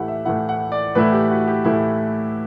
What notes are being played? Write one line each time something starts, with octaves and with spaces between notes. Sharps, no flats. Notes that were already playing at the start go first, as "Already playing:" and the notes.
Already playing: A2 E3 A3 E4 G4 F#5
E5
A2 E3 A3 E4 F#5
F#5
D5
A2 E3 A3 E4 B4
G4
F#4
G4
A2 E3 A3 E4